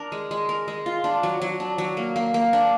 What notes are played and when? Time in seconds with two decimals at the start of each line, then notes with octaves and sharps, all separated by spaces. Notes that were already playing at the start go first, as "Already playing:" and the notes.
Already playing: D4 A#4
0.12 G#3
0.31 G#3
0.49 A#4
0.68 G#3
0.86 F4
1.04 D4
1.23 F#3
1.42 F#3
1.60 D4
1.78 F#3
1.97 A#3
2.16 A#3
2.34 A#3
2.53 D4